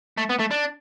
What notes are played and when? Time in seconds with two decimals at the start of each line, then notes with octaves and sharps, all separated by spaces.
0.18 A3
0.29 B3
0.39 A3
0.51 D4